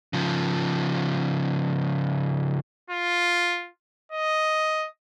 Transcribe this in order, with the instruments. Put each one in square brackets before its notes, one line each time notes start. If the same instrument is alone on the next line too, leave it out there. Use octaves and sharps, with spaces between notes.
[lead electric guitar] C#3 F3
[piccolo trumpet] F4
D#5